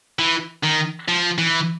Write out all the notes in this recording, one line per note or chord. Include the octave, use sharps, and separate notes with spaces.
E3
D#3
F3
E3